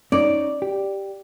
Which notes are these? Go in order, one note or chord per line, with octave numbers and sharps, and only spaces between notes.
C#4 D#4 C#5 D5
G4